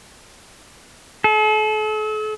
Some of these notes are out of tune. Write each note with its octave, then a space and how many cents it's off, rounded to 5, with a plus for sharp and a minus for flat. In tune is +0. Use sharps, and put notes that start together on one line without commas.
A4 -40